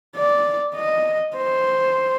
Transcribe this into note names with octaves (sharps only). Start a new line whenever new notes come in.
D5
D#5
C5